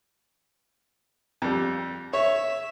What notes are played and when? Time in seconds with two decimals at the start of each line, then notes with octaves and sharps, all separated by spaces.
1.42 F2 G3
2.13 C#5 E5